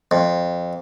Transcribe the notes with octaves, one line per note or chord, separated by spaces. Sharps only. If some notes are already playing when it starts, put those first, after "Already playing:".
F2